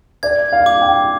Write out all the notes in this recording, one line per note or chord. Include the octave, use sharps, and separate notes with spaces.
D5 G#6
F5
D6
G5